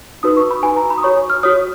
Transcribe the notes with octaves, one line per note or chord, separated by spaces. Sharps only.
D#4 F#4 B4 D#6
C#6
B5
D#4 F#4 B4 G#5
A#5
B5
D#6
F#4 C#5 C#6
F6
F#4 C#5 D#6